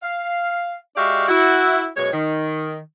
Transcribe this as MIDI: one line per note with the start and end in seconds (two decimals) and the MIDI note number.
0.03 0.75 77
0.96 1.25 56
0.96 1.25 66
0.96 1.25 67
0.96 1.25 74
0.96 1.25 76
0.96 1.25 77
1.28 1.87 64
1.28 1.87 66
1.97 2.10 42
1.97 2.10 47
1.97 2.10 56
1.97 2.10 73
2.12 2.77 51